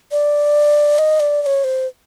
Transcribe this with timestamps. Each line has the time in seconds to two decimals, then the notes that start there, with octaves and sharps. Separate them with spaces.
0.12 D5
0.98 D#5
1.20 D5
1.42 D5
1.46 C#5
1.64 C5